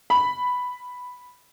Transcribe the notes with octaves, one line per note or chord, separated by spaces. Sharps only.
B5